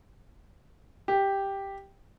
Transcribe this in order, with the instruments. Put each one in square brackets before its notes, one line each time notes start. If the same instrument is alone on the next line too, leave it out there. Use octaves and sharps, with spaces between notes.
[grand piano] G4